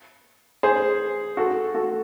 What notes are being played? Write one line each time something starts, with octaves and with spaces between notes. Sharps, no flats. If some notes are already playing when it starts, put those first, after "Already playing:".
G#4 C5
F#4 A4
F#4 A4